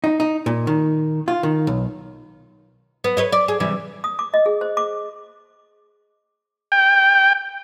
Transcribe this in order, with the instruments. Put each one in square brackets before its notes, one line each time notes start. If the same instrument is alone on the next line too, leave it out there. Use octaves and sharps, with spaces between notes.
[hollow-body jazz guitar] D#4
D#4
A#2
D#3
F4
D#3
B1
[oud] B3
B4 C#5 D#5
D5
G#4
C3 E3 G3
[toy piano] D#6
D6
D#5
G#4
C5
D6
[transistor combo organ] G5